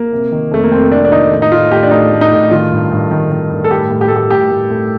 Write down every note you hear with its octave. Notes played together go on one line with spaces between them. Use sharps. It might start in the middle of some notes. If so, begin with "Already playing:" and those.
Already playing: A#3
C3
D#3
F2 A3
A#3
F2 C4
C3 D4
D4
D#3 D#4
A2
D#4
A2 F4
A2 G4
D4
A2 D#4
A2
D#4
A2
D#3 F4
G2
G2
D#3
D#3
G2
A4
A2 G4
A2
G4
A2 A4
G4
A2 G4
A2
A2